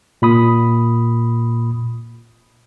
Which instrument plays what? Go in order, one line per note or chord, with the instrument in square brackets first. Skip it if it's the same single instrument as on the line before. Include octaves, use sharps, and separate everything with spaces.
[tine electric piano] A#2 B5 D#6